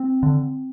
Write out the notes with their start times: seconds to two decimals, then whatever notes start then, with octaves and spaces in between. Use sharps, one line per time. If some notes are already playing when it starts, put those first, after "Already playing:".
Already playing: C4
0.23 D3